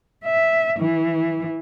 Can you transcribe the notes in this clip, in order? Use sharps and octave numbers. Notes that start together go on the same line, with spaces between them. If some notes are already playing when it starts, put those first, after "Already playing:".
E5
E3